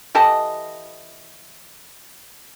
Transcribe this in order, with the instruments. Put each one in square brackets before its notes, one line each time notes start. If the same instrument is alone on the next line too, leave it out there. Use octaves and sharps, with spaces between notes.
[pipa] E3 G4 A4 D#5